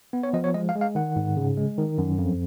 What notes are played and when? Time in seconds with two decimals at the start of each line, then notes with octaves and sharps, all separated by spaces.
0.13 B3
0.23 C#5
0.33 F3 D#5
0.44 C#5
0.54 G#3 D#5
0.69 F5
0.75 G#3
0.81 F5
0.95 D#3 F#5
1.16 G#2
1.37 C#3
1.57 G#3
1.78 D#3
1.98 F#2
2.18 F2